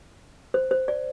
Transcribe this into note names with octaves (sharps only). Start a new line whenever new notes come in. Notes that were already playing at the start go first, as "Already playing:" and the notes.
C5
C5
D5